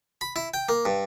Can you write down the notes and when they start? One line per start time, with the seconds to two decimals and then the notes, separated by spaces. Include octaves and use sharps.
0.21 B5
0.36 E4
0.54 G5
0.69 A#3
0.85 G2